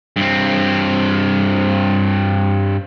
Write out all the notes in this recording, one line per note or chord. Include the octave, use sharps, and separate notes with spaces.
G2 C4